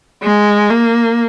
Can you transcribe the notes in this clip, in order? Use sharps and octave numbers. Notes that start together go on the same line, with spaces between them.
G#3
A#3